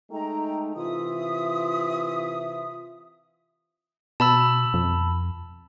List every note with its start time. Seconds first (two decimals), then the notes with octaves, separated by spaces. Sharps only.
0.11 G#3 A3 D#4 G5 A#5
0.76 C3 E3 F4 E5 D#6
4.20 B2 A5 B5 E6
4.74 F2